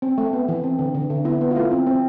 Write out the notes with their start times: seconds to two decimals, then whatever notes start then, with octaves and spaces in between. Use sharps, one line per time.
0.02 C4
0.18 A3
0.33 B3
0.48 E3
0.64 C4
0.79 D3
0.94 D3
1.10 D3
1.25 B3 E4
1.41 B3
1.51 F4
1.56 A3 E4
1.71 C4
1.87 C4